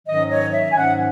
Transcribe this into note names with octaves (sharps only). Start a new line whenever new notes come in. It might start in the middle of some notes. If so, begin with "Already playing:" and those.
G#2 D#3 F#3 C#4 D#5
C#5
E5
G#5
G#2 D#3 F#3 C#4 F#5